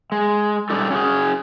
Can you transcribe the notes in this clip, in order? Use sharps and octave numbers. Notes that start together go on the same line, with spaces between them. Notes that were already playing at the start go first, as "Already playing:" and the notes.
G#3
G3 C#4 D#4 G4 A4
C#4 F#4 G#4